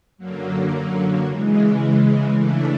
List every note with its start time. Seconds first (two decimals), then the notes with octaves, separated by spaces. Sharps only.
0.18 F#2 D3 F#3 A#3
1.25 C#3 E3 G#3
2.31 C#3 E3 A3 D4